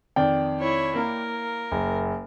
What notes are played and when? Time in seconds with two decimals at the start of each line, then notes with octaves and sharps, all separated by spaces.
0.16 F2 D#3 D5 G5
0.59 E4 C#5
0.96 A#3 A#4
1.72 F#1